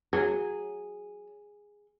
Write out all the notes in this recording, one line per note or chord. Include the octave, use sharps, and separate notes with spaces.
F#3 G#4